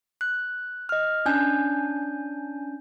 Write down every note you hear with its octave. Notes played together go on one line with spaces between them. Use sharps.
F#6
D#5 F6
C#4 D4 G#5 G6